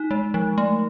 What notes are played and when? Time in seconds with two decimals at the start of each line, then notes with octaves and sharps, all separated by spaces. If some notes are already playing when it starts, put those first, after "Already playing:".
Already playing: D#4
0.11 G#3
0.34 F3
0.58 A3